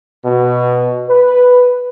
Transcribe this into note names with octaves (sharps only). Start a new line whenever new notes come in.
B2
B4